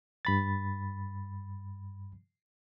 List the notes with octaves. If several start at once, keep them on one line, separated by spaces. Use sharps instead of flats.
G2 B5 A6